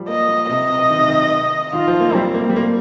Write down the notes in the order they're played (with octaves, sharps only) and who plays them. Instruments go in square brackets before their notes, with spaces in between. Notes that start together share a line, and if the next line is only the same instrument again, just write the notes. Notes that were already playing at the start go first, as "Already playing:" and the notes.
Already playing: [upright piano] F3 G3
[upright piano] A#3 [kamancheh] D#5
[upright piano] A#3
[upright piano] C3 [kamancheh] D#5
[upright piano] C3
D#3
C3
D#3
[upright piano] D#3 [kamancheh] F4
[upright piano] F3
A#3
A#3
[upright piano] G3 [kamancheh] C4
[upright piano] A#3
G3
A#3